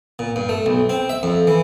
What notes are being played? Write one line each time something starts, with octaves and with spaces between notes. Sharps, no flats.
A#2
G2
A3
B1
C4
E5
F2
E3